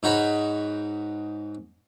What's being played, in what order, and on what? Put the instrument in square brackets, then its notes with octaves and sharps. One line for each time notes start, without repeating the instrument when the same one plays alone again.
[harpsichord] G#2 D#4 F#4 C#5 B5